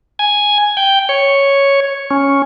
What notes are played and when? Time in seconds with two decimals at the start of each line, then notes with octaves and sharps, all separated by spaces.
0.19 G#5
0.77 G5
1.09 C#5
2.11 C#4